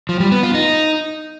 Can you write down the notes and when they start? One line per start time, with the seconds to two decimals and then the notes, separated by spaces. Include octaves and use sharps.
0.09 F3
0.20 G3
0.32 B3
0.43 F4
0.54 D#4